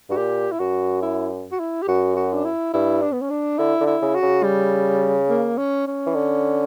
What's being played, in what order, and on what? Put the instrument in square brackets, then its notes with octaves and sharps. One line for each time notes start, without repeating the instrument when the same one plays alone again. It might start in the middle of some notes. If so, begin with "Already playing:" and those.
[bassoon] G2 [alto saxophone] F#4
[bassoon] A#2 [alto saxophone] G4
[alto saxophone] E4
[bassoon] F#2 [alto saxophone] F#4
[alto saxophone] E4
F#4
E4
G4
[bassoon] F#2 [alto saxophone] F#4
[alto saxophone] F#4
D4
E4
[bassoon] G2 [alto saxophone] E4
[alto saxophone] D4
B3
C#4
D4
[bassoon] D3 [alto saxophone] E4
[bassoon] D3
[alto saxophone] E4
[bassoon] C#3
[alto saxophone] F#4
[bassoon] C#3
[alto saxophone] G3
A#3
C#4
C#4
[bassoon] E3
D3